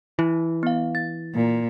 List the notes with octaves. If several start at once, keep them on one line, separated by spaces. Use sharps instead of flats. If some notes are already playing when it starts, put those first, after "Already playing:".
E3 E4
B3 F5
A6
A#2